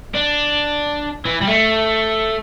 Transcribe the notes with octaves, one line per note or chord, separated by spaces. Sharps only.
D4
E3
G3
A3